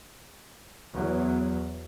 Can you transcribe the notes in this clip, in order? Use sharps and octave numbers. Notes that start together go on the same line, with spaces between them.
E2 F#3